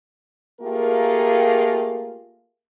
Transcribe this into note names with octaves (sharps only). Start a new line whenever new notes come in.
A3 A#3 F4 G4 G#4 A#4